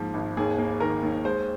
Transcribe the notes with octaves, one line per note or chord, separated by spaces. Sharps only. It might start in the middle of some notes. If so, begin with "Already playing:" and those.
Already playing: G#2 F3 A#3
G#1
D#2 G#4
A#3
D#3 A#4
D#2
G#3 C5